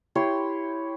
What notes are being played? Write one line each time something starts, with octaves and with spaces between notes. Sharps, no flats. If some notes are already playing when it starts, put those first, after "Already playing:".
E4 G4 C#5 C6